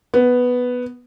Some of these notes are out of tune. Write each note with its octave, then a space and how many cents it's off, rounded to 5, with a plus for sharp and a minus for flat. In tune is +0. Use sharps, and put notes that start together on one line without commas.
B3 +0